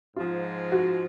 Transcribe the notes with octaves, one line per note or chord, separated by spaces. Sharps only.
G#2 F3 G#3 F4
F#4